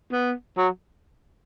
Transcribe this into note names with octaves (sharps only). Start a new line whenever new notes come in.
B3
F#3